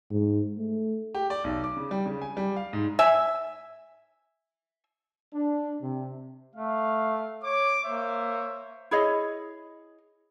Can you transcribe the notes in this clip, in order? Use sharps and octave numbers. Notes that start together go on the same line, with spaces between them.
G#2
A3
G4
D5
B1
D6
C#3
G3
C#3
G#5
G3
F5
G#2
E5 G#5
D4
C3
A3 F5
C#5 D6
A#3 C5 C#5 E5
E4 G#4 C#5 D#5